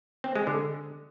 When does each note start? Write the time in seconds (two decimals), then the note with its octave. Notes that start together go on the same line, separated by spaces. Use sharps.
0.24 C4
0.35 G#3
0.47 D3